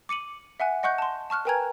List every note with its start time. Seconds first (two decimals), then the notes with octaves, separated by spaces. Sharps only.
0.09 D6 C#7 D#7 F#7
0.60 E5 F#5 G#5 F#6
0.83 D#5 F#5 C#6 F#6 G6
0.98 A5 C6
1.30 A5 C#6 F6 F#6
1.45 A#4 B4 G5 G#5 A#5 G#6